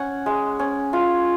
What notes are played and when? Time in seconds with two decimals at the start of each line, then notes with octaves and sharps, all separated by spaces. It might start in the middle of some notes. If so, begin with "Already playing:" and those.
Already playing: C#4 F#5
0.26 G#3
0.59 C#4
0.93 F4